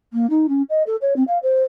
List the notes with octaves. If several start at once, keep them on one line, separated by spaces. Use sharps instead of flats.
A#3
D#4
C#4
D#5
A4
C#5
C4
F5
C5